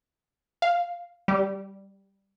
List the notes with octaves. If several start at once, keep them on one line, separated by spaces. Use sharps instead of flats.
F5
G3